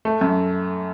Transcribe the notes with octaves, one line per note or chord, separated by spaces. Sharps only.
A3
F#2